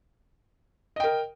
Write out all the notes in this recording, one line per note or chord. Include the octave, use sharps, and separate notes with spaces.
A#4 D#5 G5